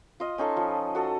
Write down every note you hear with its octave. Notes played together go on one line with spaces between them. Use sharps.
F4 D#5
C#4 D#4 F4 A4
F3
F#4 A4 D#6